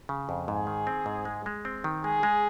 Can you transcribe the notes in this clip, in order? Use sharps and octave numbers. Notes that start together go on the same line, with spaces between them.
C#3
F2
G#2 G#4
D#3
C4
G#2
G#3
G#3
C4
D#3
G#3 G#4
G#3